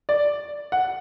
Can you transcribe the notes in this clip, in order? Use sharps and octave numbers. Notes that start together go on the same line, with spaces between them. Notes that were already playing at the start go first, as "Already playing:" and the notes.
D5
F#5